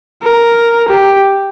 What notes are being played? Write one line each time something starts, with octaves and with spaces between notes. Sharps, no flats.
A#4
G4